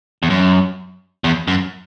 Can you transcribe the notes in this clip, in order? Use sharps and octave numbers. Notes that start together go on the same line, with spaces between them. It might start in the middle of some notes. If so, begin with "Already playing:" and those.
E2
F#2
E2
F#2